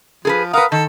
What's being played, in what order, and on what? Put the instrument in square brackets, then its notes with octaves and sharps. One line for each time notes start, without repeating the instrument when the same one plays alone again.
[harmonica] F3 [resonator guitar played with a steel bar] G#4 A4 B4
[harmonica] A#4 F#5 D#6 [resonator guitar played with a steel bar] B4 F5
[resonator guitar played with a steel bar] D#3 [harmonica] A4